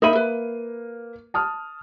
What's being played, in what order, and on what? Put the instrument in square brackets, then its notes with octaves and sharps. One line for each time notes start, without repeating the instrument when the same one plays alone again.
[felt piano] A#3 D#7 [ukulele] D#4 E5 B5
[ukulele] B4
[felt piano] A5 D#6 F6